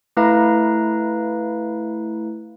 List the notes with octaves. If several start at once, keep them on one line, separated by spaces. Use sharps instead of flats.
A3 E4 B4 F5 A#5